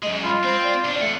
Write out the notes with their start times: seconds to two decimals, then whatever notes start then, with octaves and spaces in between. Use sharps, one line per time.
0.03 F#2 G#3 D#5
0.24 F4 B5
0.44 C4 C5
0.64 D5
0.84 C#2 D4
1.01 E2 A3 F#5